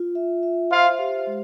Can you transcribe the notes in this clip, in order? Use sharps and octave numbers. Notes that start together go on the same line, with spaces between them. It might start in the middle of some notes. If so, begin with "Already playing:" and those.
Already playing: F4
E5
E5
F4 C5 F5
G4
G#3